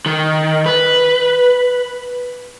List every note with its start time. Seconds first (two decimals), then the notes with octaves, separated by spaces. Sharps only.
0.06 D#3
0.66 B4